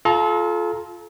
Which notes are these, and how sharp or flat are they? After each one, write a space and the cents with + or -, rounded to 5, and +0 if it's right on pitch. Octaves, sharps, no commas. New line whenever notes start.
F4 +0 A4 -35 A#5 +0